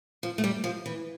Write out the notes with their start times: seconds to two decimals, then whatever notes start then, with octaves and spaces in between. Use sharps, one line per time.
0.23 F3
0.38 A3
0.44 G3
0.64 F3
0.86 E3